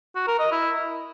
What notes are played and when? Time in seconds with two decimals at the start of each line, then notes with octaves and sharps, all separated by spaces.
0.15 F#4
0.27 A#4
0.39 D#5
0.51 E4